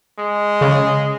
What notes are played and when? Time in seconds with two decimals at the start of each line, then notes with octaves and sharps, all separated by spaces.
0.19 G#3
0.61 C#3